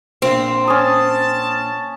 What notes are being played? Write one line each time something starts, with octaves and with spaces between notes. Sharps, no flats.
A#1 A#2 C4
C#4 A5 D#6